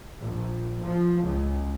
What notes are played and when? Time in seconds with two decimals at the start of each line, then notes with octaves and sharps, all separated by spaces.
0.19 A#1
0.82 F3
1.21 C#2